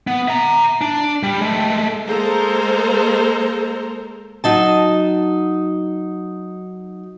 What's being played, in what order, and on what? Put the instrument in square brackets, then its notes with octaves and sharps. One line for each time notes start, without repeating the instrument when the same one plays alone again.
[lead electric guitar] B3
E5 A#5
D4
G3
G#3 A3
[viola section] G#3 A#3 A4 A#4 C5 A#5
[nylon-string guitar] F#3 D#4 A5